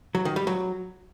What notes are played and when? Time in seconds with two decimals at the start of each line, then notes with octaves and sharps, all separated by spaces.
0.15 F#3
0.25 D#3
0.36 G3
0.47 F#3